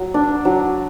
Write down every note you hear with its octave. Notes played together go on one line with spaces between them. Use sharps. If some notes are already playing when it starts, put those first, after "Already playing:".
Already playing: F#3
D4
F#3